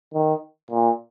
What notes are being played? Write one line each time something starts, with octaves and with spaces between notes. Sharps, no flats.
D#3
A#2